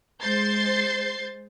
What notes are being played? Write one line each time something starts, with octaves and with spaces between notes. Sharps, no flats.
G#3 C5 G6 A6 C7